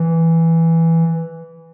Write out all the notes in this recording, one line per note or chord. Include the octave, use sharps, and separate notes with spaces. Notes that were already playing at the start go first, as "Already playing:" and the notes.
Already playing: E3